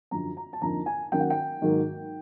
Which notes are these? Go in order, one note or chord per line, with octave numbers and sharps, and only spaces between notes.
F#2 D3 F3 A#5
A#5
A5
F2 D3 F3 A#3 D#4 A#5
G#5
D#3 F#3 A#3 C#4 G5
F#5
G5
G#2 D#3 F#3 A#3